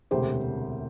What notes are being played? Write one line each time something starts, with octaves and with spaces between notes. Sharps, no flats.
E1 D2 C3 G4 C5